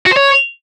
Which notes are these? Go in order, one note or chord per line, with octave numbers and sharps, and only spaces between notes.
F#4
C5
C#5